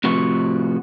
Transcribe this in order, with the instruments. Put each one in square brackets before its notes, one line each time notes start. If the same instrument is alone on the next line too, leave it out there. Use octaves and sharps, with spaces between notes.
[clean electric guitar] A2 C3 F3 F#4